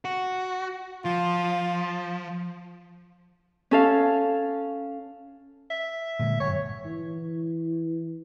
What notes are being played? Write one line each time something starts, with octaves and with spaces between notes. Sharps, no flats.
F#4
F3 F4
C#4 A4 F5
E5
A#2 D3 G#3
G1 F#2 C#5
E3